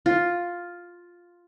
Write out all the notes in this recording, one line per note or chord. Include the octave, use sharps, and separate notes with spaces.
F4